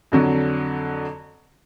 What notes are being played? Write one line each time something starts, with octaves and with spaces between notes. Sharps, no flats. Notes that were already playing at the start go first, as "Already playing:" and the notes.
F2 D3 F#3